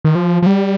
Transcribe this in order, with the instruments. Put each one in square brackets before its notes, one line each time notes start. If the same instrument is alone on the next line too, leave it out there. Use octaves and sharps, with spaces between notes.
[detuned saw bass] D#3
F3
F3
G3